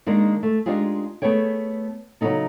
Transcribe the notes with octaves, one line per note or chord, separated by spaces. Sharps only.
D#3 G#3 A#3 D4 D#4
A3
G#3 D4 D#4 F4 G4 G#4
A3 B3 G#4 C#5 G5
C#3 F#3 B3 C#4 D#4 A4